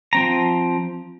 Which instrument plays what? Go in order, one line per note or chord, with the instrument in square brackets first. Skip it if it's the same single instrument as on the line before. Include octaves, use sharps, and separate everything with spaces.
[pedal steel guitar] F3 C4 A#5